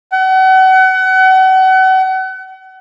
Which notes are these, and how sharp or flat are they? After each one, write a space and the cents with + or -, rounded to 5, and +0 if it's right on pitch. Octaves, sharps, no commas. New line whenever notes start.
F#5 +35